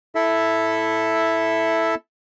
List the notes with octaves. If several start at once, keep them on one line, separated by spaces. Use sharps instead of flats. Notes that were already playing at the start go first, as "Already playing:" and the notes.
E4 A4 E5